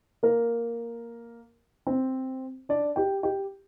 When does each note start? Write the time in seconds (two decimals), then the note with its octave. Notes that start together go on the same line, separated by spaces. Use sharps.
0.23 A#3 A#4
1.87 C4 C5
2.69 D4 D5
2.96 G4 G5
3.23 G4 G5